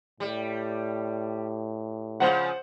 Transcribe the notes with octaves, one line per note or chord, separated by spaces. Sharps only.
A2 G3
C#3 F3 C5 F#5